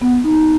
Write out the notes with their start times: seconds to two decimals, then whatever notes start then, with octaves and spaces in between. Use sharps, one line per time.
0.02 B3
0.24 D#4